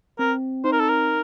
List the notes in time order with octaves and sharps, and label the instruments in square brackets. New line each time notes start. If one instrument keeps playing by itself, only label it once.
[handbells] C4 [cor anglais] A#4
[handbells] D#4 [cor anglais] C5
[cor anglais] A#4
A4
A#4